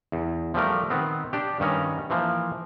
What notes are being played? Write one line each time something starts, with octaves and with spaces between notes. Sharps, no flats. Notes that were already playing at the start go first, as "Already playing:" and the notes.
E2
F3 G3 A3 A#4
D#3 B3 C4
D4 G4
G2 D#3 C#4 A#5
E3 F3 A#3